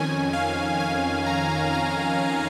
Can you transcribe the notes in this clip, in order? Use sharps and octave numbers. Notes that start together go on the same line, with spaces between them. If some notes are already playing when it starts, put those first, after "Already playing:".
Already playing: F2 D#3 C#4 G#5
F5
G#5
A#5
A#5